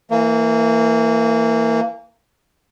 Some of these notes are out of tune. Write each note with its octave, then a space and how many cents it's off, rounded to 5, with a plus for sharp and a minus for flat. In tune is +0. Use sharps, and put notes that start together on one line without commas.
E3 +0 A#3 -25